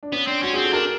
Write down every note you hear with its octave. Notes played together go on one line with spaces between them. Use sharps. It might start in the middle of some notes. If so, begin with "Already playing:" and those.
D4
B3 C#4
C4 D4
C#4 F#4
C4 G#4
A4
D4 A#4